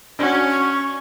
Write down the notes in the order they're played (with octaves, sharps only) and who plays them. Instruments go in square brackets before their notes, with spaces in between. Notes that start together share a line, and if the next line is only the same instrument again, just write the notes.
[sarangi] C#4 [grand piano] D4 F#4
[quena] C#6